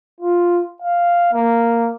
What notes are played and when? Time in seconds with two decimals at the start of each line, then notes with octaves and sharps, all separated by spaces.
0.21 F4
0.82 F5
1.33 A#3